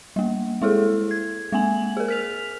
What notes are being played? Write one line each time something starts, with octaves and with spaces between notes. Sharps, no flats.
G3 A#3
G#3 E4 G#4 A4
G#6
G#3 A#3 G#5 F#7
G#4 A#4
F6 B6 F7